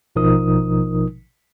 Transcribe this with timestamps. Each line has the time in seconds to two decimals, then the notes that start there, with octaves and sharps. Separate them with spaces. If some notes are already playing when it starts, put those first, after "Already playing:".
0.16 A1 B2 F3 D#4 A#4 D#6